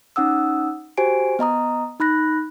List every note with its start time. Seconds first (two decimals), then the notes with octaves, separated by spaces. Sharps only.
0.16 C#4 D#4 F#5 D#6 E6
0.97 F#4 G4 C5 G#5 D7
1.39 B3 D#5 A#5 D#6
2.00 D#4 B5 F#6 A#6